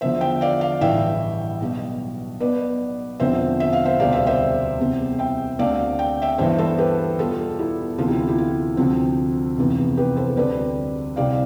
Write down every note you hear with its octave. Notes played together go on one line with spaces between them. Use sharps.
E2 D3 F3 C5 E5
E5 G5
D5 F5
D5 F5
A1 G2 E3 E5 G5
B1 B2 G3
B1 B2 B3 B4 D5
E1 E2 D3 F3 C4 C5 E5
E5
F5
C5 E5
E1 D2 C3 G3 D5 F5
C5 E5
C5 E5
E2 C3 G3
E5 G5
D2 D3 A3 C4 D5 F5
G5
E5 G5
G2 E3 B3 C5 E5
A4 C5
G4 B4
E2 B2 G3 B3 F4 A4
E4 G4
D2 C3 E3 B3 F4 A4
E4 G4
F4
E4 G4
F4
D2 C3 F3 C4
F1 E2 C3 E3
G4 B4
A4 C5
D2 C3 G3 C4 B4 D5
C2 C3 G3 C4 D5 F5